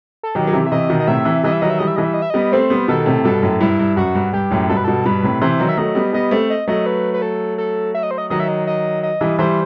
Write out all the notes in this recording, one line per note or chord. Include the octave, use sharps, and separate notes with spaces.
A4
D#3 F#3 G4
F#3
C3 E3
E5
C3 E3 D#5
B2 D#3
D#5
A2 C3 E5
C3 E3
E3 G3 D#5
E5
D#3 F#3 D#5
E5
E3 G3 D#5
E5
E3 G3 D#5
E5
D#5
E5
G3 B3 D#5
A3 C4 C5
G3 B3
B2 D#3 A4
A2 C3
G2 B2 A4
F#2 A2
G2 E4
G2
F#2 F#4
G2
G2 G4
F#2 A2
G2 B2 A4
B4
G2 B2 A4
G2 B2 B4
A2 C3
C3 E3 C5
D#3 F#3
E5
F#3 A3 D#5
G3 B3
G3 B3 D#5
A3 C4
D#5
F#3 A3 D#5
B4
B4
A4
A4
E5
D#5
C5
D#5
D#3 F#3 D#5
E5
D#5
D#5
D#5
E3 G3
E3 G3 C5